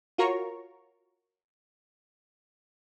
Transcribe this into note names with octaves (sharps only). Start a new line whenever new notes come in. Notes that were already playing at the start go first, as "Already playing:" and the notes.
F4 F#4 A#4 C#5 A#5 C#6